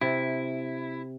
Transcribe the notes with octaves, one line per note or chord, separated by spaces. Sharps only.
C3 E4